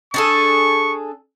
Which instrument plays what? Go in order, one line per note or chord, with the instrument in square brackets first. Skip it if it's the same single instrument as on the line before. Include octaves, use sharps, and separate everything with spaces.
[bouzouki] D4 G#4 A4 [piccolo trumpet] C#6